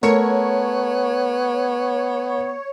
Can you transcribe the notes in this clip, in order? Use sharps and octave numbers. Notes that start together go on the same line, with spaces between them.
A3 B3 A#4 C#5 C#7